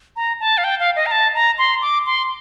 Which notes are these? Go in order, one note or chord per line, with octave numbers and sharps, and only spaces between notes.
A#5
A5
F5
G5
F5
D#5
A#5
A5
A#5
C6
D6
C6